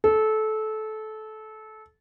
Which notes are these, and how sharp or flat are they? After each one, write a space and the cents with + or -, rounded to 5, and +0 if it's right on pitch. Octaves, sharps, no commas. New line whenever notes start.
A4 -20